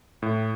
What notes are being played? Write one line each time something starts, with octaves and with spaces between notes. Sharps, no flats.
A2